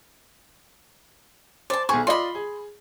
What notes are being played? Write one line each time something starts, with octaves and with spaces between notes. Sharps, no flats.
C5 D5 A5
B1 G#4 C5 C#6
F4 D5 D#5 B5 C6
G#4